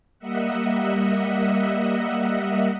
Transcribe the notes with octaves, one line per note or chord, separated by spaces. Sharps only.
G3 A#3 D#5 E5 F#5